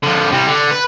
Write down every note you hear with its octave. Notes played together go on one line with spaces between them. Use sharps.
D3 F3
C3 G3
D3
B4